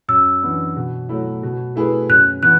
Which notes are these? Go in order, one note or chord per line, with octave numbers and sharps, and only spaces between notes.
F#2 E6
E3 B3 D4
B2
F#3 A3 E4
B2
A3 E4 G#4 B4
F#2 F#6
E3 B3 F#6